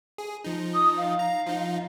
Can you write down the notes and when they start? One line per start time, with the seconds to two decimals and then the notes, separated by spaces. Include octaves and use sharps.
0.18 G#4
0.44 F3 D#4
0.73 D#6
0.97 F5
1.19 A#5
1.46 F3 D#4